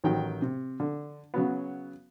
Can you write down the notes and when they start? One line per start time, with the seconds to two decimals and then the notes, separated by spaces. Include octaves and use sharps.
0.04 A1 D#3 F#3 G5
0.42 C3
0.80 D3
1.34 C#3 F#3 B3